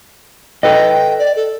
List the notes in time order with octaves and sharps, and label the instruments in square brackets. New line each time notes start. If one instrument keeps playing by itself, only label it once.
[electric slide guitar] A4 B4 D#5 [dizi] G5
[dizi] D5
A4